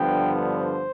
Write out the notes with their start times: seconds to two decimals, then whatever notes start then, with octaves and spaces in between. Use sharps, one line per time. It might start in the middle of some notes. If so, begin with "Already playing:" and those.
Already playing: G2 D3 F3 B3 G5
0.56 C5